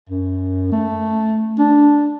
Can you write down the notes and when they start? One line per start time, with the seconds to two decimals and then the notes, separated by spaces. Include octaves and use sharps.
0.09 F#2
0.72 A3
1.59 D4